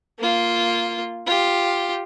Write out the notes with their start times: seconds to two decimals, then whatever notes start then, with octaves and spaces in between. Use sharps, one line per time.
0.19 A#3 F4
1.26 F4 G4